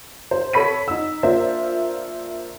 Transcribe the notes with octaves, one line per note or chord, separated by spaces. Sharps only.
C5
A4 C#5 B5 B6 D#7
D#4 E6
A#3 D4 F4 C5 E5